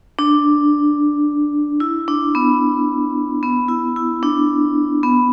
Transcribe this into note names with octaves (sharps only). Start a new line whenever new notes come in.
D4
E4
D4
B3
B3
E4
E4
D4
B3